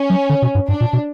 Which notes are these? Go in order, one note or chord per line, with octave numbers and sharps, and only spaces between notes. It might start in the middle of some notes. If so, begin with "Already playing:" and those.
Already playing: C#4
F#3
D3
B2
G2
G2 D4
A#2
B2